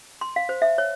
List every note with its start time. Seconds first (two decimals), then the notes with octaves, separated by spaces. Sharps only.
0.21 C6
0.36 F5
0.49 C5
0.62 E5
0.78 C#5